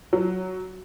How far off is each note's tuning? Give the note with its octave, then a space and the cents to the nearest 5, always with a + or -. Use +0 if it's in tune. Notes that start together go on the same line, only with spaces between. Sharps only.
F#3 +5